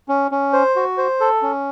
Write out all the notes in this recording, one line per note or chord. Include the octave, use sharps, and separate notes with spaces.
C#4
C#4
C5
F#4
C5
A4
C#4